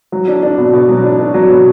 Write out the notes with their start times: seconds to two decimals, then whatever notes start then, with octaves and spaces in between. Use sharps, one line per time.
0.12 F#3
0.28 D4
0.43 D4
0.58 B2
0.73 B2
0.89 F#3
1.04 D4
1.19 D4
1.34 F#3
1.50 B2